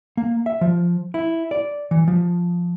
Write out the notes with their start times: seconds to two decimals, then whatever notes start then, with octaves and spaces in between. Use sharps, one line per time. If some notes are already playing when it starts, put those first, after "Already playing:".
0.17 A#3
0.46 E5
0.61 F3
1.14 E4
1.51 D5
1.91 E3
2.08 F3